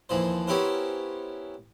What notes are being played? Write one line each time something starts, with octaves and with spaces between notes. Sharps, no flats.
D#2 E3 F3 C5
B3 C#4 E4 G4 A#4 C5